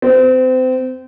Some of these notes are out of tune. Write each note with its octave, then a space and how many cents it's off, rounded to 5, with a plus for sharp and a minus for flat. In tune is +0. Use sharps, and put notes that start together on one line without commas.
C4 -30